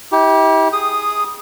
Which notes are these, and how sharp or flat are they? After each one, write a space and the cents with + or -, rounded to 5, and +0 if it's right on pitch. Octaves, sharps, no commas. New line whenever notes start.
E4 -45 G4 +0
G#4 +0 D#6 -10